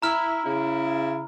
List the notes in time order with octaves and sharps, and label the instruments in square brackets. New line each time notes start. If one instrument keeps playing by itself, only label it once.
[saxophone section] E4 [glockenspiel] A#5 F6
[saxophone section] C#3 E4